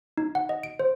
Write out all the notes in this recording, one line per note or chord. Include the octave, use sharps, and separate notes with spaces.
D#4
F#5
D#5
D7
C5